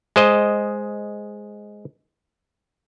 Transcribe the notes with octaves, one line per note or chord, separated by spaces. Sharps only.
G#3 C5 D#5